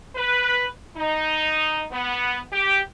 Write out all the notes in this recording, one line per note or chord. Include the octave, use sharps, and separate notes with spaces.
B4
D#4
B3
G4